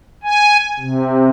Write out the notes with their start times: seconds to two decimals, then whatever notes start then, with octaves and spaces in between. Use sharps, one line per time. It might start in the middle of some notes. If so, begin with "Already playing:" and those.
0.23 G#5
0.79 C3